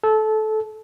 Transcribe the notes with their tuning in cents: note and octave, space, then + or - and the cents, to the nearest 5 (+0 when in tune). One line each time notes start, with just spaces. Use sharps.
A4 -20